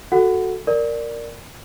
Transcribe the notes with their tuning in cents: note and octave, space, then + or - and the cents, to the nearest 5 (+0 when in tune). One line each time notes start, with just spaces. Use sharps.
F#4 +0 A4 +0 F#5 +0
A#4 -5 D5 +0